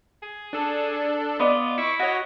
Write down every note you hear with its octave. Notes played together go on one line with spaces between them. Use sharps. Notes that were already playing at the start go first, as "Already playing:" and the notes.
G#4
D4 A4
B3 F4 D5 D#5
E4 C#6 D6
F#4 C#5 D#5